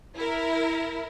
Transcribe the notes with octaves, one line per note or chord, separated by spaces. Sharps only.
E4 A#4